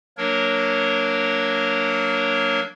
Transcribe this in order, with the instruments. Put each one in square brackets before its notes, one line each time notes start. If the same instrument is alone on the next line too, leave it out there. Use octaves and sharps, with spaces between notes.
[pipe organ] F#3 A#3 D4 A#4 C#5